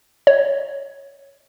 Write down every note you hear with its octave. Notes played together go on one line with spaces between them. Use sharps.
C#5